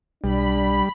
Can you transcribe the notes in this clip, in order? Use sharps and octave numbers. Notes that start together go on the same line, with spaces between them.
B1 G3 D4 B5